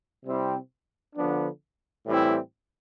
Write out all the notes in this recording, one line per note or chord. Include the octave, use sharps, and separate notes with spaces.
C3 G3 C4 E4
D3 F3 B3 D4
A2 E3 G3 C4 E4